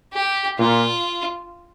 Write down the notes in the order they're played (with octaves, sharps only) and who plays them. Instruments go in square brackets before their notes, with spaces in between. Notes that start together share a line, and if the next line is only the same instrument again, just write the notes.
[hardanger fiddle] G4
[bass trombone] A#2 [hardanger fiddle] F4